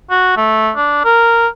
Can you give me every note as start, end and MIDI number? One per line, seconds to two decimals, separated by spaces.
0.11 0.34 66
0.37 0.71 57
0.76 1.03 62
1.05 1.48 70